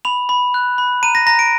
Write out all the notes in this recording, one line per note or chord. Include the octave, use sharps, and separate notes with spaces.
B5 F7
B5
F#6
B5
A#5 D#7
A#6
A#5 A#6
D7